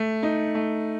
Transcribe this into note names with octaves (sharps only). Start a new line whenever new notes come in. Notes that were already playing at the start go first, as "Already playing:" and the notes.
Already playing: A3
D#4
A3